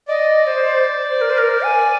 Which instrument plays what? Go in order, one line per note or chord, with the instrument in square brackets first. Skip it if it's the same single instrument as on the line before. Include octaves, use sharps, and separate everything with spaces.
[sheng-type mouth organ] D5 [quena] D#5
[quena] C5
C5
A#4
C5
A#4
G#5